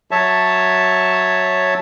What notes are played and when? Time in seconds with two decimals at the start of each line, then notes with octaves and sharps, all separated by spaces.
0.11 F#3 C#5 E5 A5